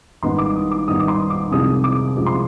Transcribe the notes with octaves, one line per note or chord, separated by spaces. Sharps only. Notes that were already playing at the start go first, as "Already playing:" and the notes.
G#1 G#2 D#3 G3 B3 C6
D6
D#6
D6
G#1 G#2 D#3 G3 B3 D#6
D6
C6
D6
C2 C3 F3 G#3 D#6
D6
C2 C3 F3 G#3
C6